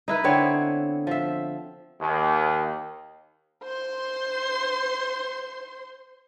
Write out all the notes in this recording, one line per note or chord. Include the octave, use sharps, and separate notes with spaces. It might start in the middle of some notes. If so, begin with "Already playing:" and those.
D#4 E4 B4
D3 B3 C4 C#5
F3 E5
D#2
C5 C6